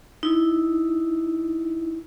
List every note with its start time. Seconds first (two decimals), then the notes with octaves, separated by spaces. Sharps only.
0.23 D#4 E4